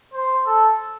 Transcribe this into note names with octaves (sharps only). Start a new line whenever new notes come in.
C5
A4